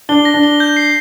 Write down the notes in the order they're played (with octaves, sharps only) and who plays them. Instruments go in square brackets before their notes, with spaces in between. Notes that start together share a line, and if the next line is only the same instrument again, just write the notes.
[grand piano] D4 [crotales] G7
[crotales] A#6
[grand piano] D4
[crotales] G7
G6
C7